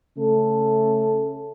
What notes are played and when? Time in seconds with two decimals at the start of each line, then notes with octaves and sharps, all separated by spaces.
0.17 C#3 A3 C#4 A4